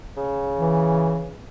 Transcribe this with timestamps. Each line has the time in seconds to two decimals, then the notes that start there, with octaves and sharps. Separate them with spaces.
0.17 C#3
0.58 E3